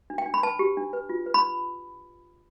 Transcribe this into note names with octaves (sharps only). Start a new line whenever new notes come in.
D4
G5
D4
B5
B4 A5
G4
D4
B4
F4
B4
B5